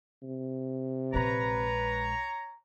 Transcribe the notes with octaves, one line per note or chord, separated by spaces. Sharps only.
C3
A#1 G#3 B4 C#5 A#5